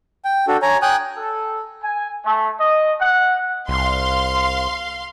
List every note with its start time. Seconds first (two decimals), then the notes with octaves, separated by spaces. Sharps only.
0.25 G5
0.48 D4 F#4 A4
0.62 C#5 G#5 A#5
0.82 G5 G#5 D#6 F#6
1.17 A4
1.83 G#5
2.25 A3
2.59 D#5
3.00 F#5
3.68 C2 F5 C6